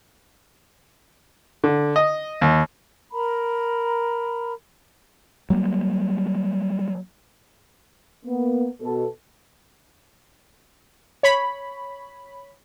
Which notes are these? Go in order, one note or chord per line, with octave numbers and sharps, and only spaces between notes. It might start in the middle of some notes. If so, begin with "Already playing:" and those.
D3
D#5
D#2
A#4 A#5 B5
F#3 G3 A#3
A#3 B3
B2 A4
C#5 B5